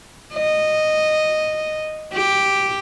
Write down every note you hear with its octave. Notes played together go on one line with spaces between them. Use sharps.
D#5
G4